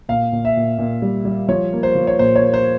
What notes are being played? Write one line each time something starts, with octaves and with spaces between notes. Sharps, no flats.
A#2 F5
A#2
E5
A#2
A#2
G3
G3
F3 C#5
A#3
C5
F3
C#5
A#2 C5
C#5
A#3
C5